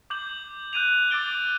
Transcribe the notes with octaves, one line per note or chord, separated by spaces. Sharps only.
D6 G6 F#7
F#6 G6 D#7 F7
D6 E6 A6 D7 G7